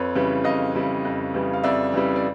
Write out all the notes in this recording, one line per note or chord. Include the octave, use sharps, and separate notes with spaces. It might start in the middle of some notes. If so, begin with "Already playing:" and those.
Already playing: F2 B4 C#5
C#3 E3 G3
F2 D#5 F5
C#3 E3 G3
F2
C#3 E3 G3
F5
F2 D5 E5
C#3 E3 G3
D5